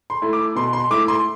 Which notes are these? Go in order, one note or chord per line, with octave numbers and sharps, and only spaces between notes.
C6
A3 E4
D6
B2 C6
C6
A3 E4 D6
C6